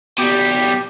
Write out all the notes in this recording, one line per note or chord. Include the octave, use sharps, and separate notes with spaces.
B2 G3 G4